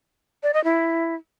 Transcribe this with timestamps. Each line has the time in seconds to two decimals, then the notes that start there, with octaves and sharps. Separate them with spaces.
0.43 D5
0.54 D#5
0.64 E4